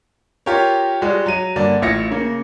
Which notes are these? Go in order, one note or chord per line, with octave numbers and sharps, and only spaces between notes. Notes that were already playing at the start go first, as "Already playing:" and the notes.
F4 G4 A#4 C#5
G3 G#3 F4 F#4
F#3 D#7
G2 D3 A#3 D4
A1 F4 E5 A#6 C#7
C#3 A#3